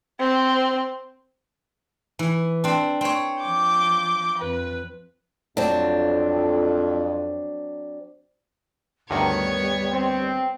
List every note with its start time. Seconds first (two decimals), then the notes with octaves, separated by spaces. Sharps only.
0.20 C4
2.19 E3
2.64 C4 D4
3.01 C4 C#5
3.42 F3 D6 G6
4.38 F2 B4
5.57 F2 F#3 C4 D4
9.10 D2 G2 D#3 G3 B3 C#5
9.91 C4